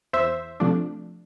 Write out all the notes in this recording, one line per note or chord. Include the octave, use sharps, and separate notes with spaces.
E2 C5 E5
C3 F3 A3 D4